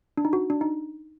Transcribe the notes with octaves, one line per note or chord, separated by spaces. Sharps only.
D4
D#4
F#4
D4
D#4